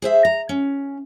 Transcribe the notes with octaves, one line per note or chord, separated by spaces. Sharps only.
G#4 C5 E5
A#5
C#4